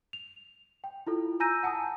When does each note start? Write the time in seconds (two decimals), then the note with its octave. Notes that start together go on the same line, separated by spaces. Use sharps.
0.13 F7
0.84 G5
1.07 E4 F4 A4
1.40 G#5 A#5 E6 G6 A#6 D#7
1.63 F#5 G#5 A5 D#6